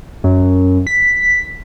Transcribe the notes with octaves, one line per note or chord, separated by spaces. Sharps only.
F#2
B6